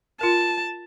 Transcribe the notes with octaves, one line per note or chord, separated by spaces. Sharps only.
F4 A#4 A5